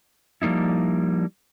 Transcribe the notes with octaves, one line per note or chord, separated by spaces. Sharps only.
F3 G3 A#3 D#4 E4